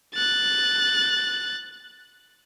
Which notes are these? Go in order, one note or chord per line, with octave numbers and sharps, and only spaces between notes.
F#6 A6